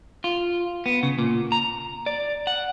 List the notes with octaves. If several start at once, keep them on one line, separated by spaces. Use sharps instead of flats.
F4
B3
C#3
A#2
A#5
D5
F#5